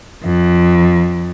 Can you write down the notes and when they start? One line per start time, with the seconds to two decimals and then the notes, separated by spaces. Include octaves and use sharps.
0.24 F2